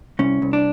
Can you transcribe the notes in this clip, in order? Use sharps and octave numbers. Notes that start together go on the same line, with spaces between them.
C2 C#4
C2
D4